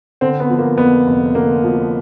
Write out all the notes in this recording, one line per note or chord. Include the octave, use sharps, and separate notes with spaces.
D3 C4
B3
F3
A#3
F2 B3
F1
D3 A#3
F3